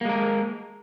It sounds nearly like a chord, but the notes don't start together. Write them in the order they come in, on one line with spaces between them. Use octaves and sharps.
A#3 G#3 A#4